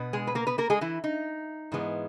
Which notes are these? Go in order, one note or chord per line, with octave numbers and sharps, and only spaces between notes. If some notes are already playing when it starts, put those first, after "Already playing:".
Already playing: B2 B3
G#3 G#4
B4
A#3 A#4
B3 B4
A#3 A#4
G#3 G#4
E3 E4
D#4
G#2 E3 G#3 B3